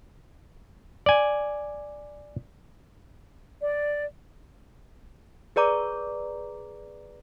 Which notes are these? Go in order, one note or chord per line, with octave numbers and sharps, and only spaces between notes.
D5 G#5
D5
G#4 B4 D5 A#5 D6